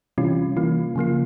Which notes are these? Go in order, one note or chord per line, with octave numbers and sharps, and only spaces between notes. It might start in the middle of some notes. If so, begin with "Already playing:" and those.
C3 E3 G3 C#4 F4
E3 A#3 F4
C#3 F3 A#3 F4